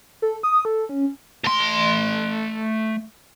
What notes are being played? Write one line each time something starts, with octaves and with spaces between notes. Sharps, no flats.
A4
D#6
A4
C#4
A3 C6